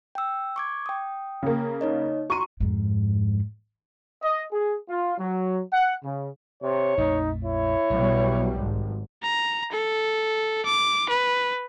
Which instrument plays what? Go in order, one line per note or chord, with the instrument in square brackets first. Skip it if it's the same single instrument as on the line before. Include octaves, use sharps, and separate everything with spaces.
[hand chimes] G5 E6
C#6 D6 G#6
G5 D#6
[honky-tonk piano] C#3 A#3
[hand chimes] D#4 C#5 D#5
[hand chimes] F#4 A#5 C6 [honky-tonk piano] C#6 D#7
[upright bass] F2 G#2
[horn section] D#5
G#4
F4
F#3
F#5
C#3
[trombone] C3 [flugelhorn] C#5
[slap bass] A#1 F2 A3 [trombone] D#4
[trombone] E4 [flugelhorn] C#5
[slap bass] B1 [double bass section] B2 F#3 G3
[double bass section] G#1
[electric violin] A#5
A4
D6
B4